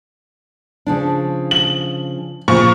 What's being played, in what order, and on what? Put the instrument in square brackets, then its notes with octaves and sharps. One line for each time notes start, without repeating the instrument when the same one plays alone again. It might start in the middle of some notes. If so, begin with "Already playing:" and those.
[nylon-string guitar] C#3 F3 D4
[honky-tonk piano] F#7
[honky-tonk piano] A#2 F3 C#6 [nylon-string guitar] C#3